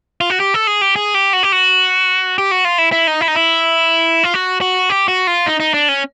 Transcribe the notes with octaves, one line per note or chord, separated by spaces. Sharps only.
F4
F#4
G4
A4
G#4
G4
G#4
G4
F#4
G4
F#4
G4
F#4
F4
E4
E4
D#4
E4
D#4
E4
F4
F#4
F#4
G4
F#4
F4
D#4
D#4
D4
C#4